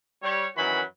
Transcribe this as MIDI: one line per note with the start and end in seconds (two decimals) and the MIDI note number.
0.23 0.47 55
0.23 0.47 73
0.57 0.81 42
0.57 0.81 51
0.57 0.81 52
0.57 0.81 54
0.57 0.81 66
0.57 0.81 83